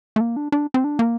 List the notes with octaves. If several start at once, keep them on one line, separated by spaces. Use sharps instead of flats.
A3
A#3
D4
D4
C4
D4
A#3